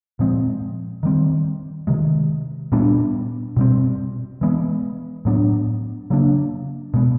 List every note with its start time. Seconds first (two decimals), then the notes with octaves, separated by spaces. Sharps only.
0.19 A#2 F3 G#3 C4
1.03 D#3 G3 C4
1.87 C3 D#3 G#3
2.72 A#2 G3 B3 D4
3.57 B2 G3 C4
4.41 E3 G#3 B3
5.25 A2 F#3 B3 D4
6.10 C#3 F#3 A#3 D4
6.94 B2 G#3 B3